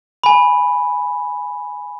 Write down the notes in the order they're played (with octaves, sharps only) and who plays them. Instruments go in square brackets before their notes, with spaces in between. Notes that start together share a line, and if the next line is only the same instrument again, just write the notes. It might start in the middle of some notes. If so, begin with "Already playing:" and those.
[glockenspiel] G#5 B5